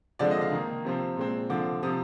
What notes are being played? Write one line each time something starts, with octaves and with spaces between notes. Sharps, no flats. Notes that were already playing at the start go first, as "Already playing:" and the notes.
D3 F3 G#3 C4 D5
D#5
F5
D#3 A#3
C3 F3 C4
A#2 G#3 C4
D3 F3 C4 D6
C3 F3 C4 D#6